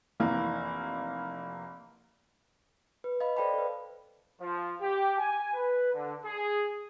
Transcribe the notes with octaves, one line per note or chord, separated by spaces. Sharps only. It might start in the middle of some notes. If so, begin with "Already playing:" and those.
F1 E3 A#3
B4
D#5 F5 B5
A4 C5 D5 G5 A5 B5
A4 B4
F3
G4
G#5
B4
D3
G#4